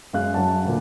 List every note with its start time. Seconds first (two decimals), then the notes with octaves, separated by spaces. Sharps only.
0.13 F#2 G#3 F5 F#6
0.34 F#2 F#3 F#5 A5
0.65 D2 A#2